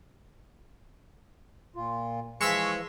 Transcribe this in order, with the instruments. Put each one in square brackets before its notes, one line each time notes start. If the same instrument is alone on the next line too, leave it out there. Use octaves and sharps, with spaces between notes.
[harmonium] A#2 F4
[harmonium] E3 F3 [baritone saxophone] G#3 [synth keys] C#6 E6 B6